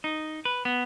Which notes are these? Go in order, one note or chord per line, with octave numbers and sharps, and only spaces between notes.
D#4
B4
B3